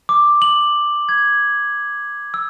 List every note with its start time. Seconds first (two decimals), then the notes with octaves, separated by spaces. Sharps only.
0.09 D6
0.42 F#7
1.09 G#6
2.34 E6